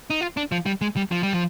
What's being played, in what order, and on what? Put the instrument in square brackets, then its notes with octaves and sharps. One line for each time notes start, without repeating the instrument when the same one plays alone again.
[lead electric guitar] D#4
F4
D4
F3
G3
G#3
G3
F3
G3
F3